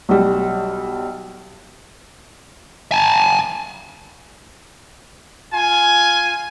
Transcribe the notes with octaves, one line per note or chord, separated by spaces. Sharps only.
B1 G3
G#5 A5
F4 G#5